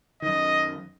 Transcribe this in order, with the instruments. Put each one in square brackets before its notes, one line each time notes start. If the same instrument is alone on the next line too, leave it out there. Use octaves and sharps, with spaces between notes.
[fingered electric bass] F#2 D#3 [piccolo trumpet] D#5